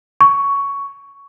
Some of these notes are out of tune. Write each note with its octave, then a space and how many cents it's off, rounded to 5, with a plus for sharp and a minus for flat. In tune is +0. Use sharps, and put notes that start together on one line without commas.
C#6 +10